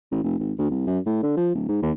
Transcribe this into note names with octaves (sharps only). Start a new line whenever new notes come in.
A1
F1
G#1
D2
C2
F#2
A2
D3
F3
D1
G#2
D#2